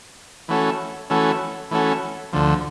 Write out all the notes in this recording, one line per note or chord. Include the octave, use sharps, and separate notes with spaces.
E3 A3 C#4 F#4 A4
E3 A3 C#4 F#4 A4
E3 A3 C#4 F#4 A4
D2 D3 F3